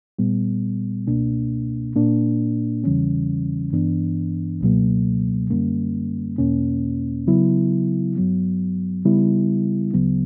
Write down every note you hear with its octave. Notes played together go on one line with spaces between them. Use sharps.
A#2 G3 B3
C#2 B2 A#3 D4
A#2 A#3 D4
E2 C#3 E3 G3 C#4
G2 E3 B3 D4
C#2 B2 F#3 A#3
F#2 D3 G3 A#3 C#4
E2 B2 A#3 C#4
C#3 F#3 B3 E4
G2 F#3 B3
C#3 G3 B3 E4
D2 C#3 F#3 B3